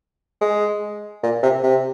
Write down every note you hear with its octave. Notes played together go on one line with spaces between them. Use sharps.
G#3
A#2
C3
C3